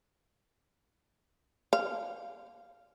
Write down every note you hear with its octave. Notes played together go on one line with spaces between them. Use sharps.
F5